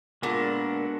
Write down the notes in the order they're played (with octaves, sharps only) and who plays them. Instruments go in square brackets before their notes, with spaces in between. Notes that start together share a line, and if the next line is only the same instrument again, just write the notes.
[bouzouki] A#2 [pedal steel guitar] G#3 B3 D4 F#4 A4